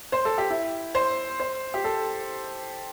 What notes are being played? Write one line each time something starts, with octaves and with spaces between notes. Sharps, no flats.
C5
A4
G4
E4
C5
C5
G4
A4